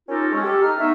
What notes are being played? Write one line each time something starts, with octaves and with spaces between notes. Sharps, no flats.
C#4 D#4 F4 G4 A4 A#4
G#3 C#4
G4 A4
D#4 F6
A3 B3 D#4 C#5 E5